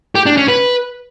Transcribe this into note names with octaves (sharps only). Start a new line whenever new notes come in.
G4
D4
C#4
B4